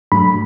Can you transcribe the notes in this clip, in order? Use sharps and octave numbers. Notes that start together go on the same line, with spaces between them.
G#2 F#3 A3 D4 B5